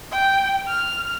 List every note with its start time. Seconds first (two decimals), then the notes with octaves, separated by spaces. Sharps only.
0.11 G5
0.68 F6